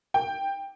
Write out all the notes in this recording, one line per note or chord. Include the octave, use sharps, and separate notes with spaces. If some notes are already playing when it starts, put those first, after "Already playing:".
G5